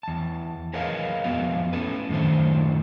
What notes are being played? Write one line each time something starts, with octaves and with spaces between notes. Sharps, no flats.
E2 A5
G#4 A#4 B4 C#5 D#5 F5
F2 B3 F#4 F5
C#4 A4 B4
F#2 A2 D#3 D4 C5